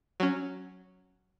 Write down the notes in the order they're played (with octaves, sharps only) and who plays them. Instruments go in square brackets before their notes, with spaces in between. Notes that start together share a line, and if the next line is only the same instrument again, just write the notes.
[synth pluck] F#3 C#4